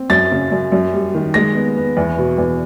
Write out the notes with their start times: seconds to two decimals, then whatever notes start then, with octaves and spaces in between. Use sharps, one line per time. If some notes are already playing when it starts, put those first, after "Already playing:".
Already playing: C4
0.10 F#2 A6
0.32 C#3
0.52 F#2
0.72 F#2
0.93 G3
1.15 D#3
1.34 G#3 A#6
1.55 B3
1.77 B3
1.97 E2
2.18 B2
2.38 E2